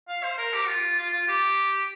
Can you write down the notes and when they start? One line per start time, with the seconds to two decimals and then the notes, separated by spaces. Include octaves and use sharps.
0.08 F5
0.23 C5
0.38 A#4
0.53 G4
0.68 F4
0.98 F4
1.13 F4
1.28 G4